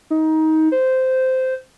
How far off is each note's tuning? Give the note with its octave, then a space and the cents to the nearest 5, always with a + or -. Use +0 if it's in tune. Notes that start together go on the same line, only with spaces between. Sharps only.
D#4 +20
C5 -10